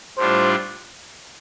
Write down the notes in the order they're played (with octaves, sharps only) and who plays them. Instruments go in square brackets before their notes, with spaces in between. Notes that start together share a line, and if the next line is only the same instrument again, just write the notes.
[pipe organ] A2 G3 D4 F4 [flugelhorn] C5